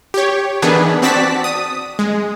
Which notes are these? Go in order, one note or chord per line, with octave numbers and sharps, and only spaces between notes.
G4 C#5
D#3 E3 B3 D4 G#4 B4
C4 F#4 D5 A5 B6
D#6
G#3